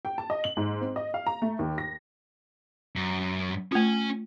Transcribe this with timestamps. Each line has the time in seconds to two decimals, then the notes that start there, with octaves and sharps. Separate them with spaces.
0.05 G5
0.18 A5
0.30 D#5
0.44 F#7
0.57 G#2
0.81 C4
0.96 D#5
1.14 F5
1.27 A#5
1.42 A3
1.59 D#2
1.78 A#6
2.96 F#2
3.72 A3 C#4 F4 G#5